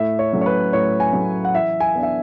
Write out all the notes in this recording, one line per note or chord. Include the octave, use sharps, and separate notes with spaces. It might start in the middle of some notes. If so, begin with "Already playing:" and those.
Already playing: A2 E5
C#5
F#3 A3 C#4
C#5
B4
A2 C#5
G#5
F#3 A3 C#4
F#5
E3 E5
G#5
B3 D4
E5